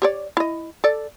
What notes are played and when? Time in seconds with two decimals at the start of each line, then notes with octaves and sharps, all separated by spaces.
0.02 G4 C#5 D5
0.37 E4 D#5
0.84 A4 D5